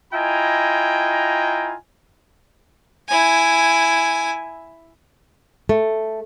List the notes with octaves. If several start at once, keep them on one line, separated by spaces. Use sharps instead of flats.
E4 F4 D#5 G5 G#5 A#5
E4 G#5
A3